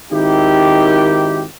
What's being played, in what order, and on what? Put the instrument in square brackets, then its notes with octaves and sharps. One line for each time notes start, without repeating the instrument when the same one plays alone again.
[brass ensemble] G#1 D#3 D#4 E4 G4